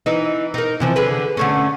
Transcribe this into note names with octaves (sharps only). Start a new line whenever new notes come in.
E3 D#4
D#4 A#4
C3 E3 F3
D3 G#4 B4
D3 A3 C#4